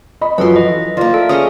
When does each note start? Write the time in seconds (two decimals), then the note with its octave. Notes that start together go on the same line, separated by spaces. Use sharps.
0.21 D#5 B5
0.38 F#2 F3 F#3 F4 A4 B4 B5 C6
0.56 E3 D#5
0.97 F3 A#3 A#4 D5 C6
1.14 A4 E5
1.29 C#4 G#4 D#5 A5 C#6 D#6